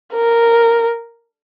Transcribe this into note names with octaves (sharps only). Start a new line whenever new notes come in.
A#4